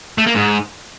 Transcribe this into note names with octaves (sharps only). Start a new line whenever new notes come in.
A3
A#3
G#2